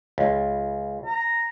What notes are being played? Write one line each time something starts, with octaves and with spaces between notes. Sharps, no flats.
C#2
A#5